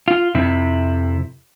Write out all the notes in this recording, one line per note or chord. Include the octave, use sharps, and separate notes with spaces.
F4
F2 C3 E4